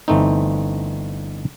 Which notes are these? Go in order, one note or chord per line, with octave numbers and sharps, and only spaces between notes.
G1 E3 A3 C4 D#4